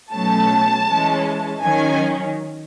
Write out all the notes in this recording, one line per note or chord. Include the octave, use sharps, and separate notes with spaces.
B2 F#3 A3 C#4 A5
E3 G#3 C#4
D#3 F#3 C#4 G#5